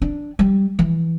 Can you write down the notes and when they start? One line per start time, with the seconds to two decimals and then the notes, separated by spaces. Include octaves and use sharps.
0.02 D4
0.39 G3
0.79 E3